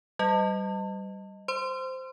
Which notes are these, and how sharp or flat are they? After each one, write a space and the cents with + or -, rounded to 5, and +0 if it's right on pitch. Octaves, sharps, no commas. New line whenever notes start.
G3 -15 D#5 +0
C5 -10 C6 -15